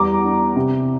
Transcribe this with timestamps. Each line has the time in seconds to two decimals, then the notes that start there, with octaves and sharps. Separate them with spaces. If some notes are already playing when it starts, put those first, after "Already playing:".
Already playing: E2 G3 A#5 D6
0.25 D4
0.56 C3